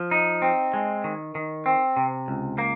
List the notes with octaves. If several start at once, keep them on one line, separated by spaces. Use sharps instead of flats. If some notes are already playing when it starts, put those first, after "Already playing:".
Already playing: F3
D#4
C4
G#3
D#3
D#3
C4
C3
C#2
A#3